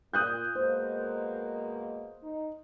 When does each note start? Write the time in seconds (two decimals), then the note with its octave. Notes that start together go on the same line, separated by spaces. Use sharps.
0.14 A#2 D#6 F#6 G6
0.55 B2 G#3 A#3 C5
2.23 D#4